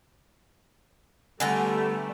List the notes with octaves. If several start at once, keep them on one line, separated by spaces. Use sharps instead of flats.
D3 G3 A3 B3 A4 G#5 A#5 F#6